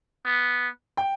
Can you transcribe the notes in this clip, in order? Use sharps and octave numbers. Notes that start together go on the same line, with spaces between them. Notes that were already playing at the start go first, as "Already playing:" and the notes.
B3
G5